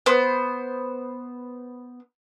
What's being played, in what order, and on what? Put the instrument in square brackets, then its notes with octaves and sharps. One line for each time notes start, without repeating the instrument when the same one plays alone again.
[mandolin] B3 C5